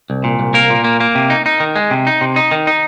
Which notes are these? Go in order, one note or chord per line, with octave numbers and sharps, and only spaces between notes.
C2
A#2
C2
A#3 A#4
A#2
A#3
A#3
C3
D#4
D#4
D#3
G#3
C3
D#4
C3
D#4
D#3
D#4